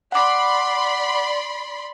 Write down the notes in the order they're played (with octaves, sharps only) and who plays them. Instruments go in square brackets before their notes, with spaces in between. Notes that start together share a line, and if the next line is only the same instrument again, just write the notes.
[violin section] D5 B5 C6 [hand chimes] F#5 D6